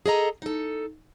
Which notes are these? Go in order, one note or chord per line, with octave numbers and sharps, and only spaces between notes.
G#4 A4 D#5 A#5
D#4 A4